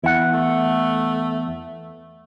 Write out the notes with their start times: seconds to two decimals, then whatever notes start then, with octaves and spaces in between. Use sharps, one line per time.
0.04 E2 E4 F#5
0.33 A3